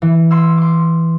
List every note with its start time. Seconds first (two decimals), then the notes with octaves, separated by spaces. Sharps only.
0.02 E3
0.31 C6 E6
0.58 C6 D6